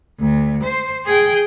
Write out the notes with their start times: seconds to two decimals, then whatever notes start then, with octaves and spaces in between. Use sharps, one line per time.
0.20 D2
0.63 C5
1.05 G#4 G5